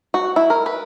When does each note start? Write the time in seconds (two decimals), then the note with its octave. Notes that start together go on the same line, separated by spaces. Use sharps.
0.14 F#4
0.36 E4
0.50 A#4
0.66 B4